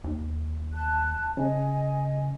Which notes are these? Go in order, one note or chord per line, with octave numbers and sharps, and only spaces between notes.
D#2
A5 F#6
C#3 D#5 G#5